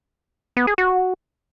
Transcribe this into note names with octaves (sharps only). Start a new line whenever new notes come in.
B3
G#4
F#4